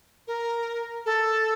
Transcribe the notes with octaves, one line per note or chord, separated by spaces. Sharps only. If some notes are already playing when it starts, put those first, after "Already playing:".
A#4
A4